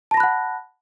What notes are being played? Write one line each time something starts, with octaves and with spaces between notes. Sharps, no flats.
F#5 A5 B5 F#6 A#6